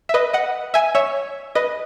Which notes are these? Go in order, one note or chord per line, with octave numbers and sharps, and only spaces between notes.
E5
B4 D#5
D#5 F#5
E5 G#5
C#5 E5
B4 D#5